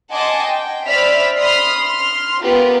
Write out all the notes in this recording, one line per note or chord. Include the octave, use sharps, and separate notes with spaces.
D#5 F#5 G#5 A5 C6 D6
G5
C5 D5 E5 B5 F6 B6
B5 C6 D#6 F6 C7
C6 F6
B3 F4 G4 A#4